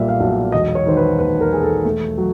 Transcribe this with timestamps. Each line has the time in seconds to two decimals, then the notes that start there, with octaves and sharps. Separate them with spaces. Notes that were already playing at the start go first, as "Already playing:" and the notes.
Already playing: B1 A#2 G3 E5
0.08 F5
0.20 B1
0.52 E1 D#5
0.75 C#5
0.86 D#3 C5
0.97 B4
1.19 D#2 B4
1.41 A#4
1.51 E1 G#4
1.63 A4
1.85 A3
2.18 F#3